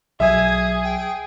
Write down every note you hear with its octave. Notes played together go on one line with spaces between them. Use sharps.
B1 F#3 G#4 E5 G#5 D#6
G5